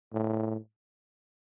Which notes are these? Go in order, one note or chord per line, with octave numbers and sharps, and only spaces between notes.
A2